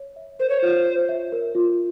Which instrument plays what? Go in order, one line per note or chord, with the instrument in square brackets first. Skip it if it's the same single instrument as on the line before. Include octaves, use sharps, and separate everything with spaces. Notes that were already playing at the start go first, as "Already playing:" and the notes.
Already playing: [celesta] C#5
E5
[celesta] A#4 [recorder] C5
[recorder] C#5
[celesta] F4 [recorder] C5
[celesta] C#5
E5
A#4
F4